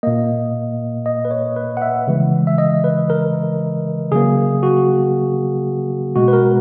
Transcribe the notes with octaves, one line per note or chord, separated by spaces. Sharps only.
A#2 A#3 D#5
D#5
B4
C#5
B4
F#5
E5
C#3 E3 G#3
E5
D#5
B4
A#4
C#3 F#3 A#3 G#4
F#4
B2 G#3 F#4
B4
A#4